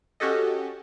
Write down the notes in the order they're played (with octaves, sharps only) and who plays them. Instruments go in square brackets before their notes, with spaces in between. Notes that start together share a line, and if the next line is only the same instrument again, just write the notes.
[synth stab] C#4 F#4 G4 A4 D#5